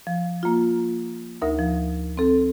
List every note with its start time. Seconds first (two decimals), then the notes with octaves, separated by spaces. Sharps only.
0.07 F3
0.43 A#3 F4
1.42 D2 D#4 A#4 E5
1.59 F3
2.17 C4 A4